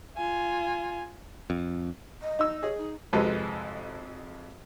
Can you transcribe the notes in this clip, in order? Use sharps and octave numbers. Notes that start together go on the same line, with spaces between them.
F4 G#5
F2
D#5
D#4 E6
G#4 C#5 D#5
D#4
G#1 F2 C3 G#3 A4 B4